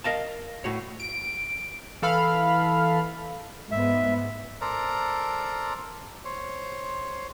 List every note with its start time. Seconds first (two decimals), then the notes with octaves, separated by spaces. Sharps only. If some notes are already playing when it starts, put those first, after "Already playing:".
0.04 A#4 D#5 F5 A5
0.64 A2 F#4 C#5
1.00 D7
2.02 E3 A4 F5 B5 F6
3.71 G#2 B3 E5
4.61 A4 A#4 C5 D5 A#5
6.25 C5 C#5